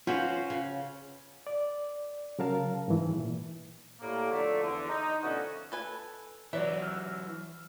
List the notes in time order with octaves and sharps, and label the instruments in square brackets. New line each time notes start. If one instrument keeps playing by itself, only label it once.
[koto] C#4 F#4 C5 [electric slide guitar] F4 B4 F5
[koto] C#3
[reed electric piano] D5
C#3 F#3 A#4 F5 A5
G#2 E3
A#2
[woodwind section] A2 G3 A#3
D3 F3 A3
E2 D3
D#4
B2 D3 F3 A3 C#4 F#4
[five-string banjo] A4 B4 G#5
[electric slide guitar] E3 F#3 [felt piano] B4 C#5 D5 [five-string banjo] E5
[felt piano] E6 F6